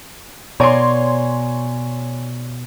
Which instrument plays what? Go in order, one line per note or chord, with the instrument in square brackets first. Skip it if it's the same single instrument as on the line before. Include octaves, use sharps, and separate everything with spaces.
[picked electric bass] B2 [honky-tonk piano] C#5 C6 [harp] D5 G#5 A#5